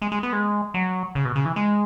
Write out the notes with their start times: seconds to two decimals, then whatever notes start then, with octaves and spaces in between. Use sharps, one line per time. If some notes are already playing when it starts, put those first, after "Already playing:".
0.02 G#3
0.12 G#3
0.23 B3
0.33 G#3
0.74 F#3
1.15 C#3
1.25 B2
1.35 C#3
1.45 E3
1.56 G#3